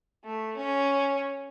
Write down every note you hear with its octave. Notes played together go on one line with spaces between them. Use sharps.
A3
C#4